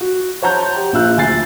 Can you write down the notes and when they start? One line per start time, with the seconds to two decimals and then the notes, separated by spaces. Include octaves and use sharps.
0.01 F#4
0.42 C5 C#5 F#5 A5 A#5 G6
0.76 G4
0.93 A#1 F4 E6 F#6 G6
1.17 D2 G#5 A6 C7